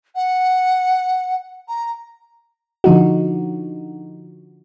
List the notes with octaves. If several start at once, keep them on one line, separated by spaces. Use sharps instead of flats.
F#5
A#5
D3 F3 D#4 F#4